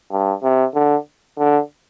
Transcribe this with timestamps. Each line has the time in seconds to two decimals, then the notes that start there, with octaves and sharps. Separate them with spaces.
0.12 G2
0.43 C3
0.74 D3
1.38 D3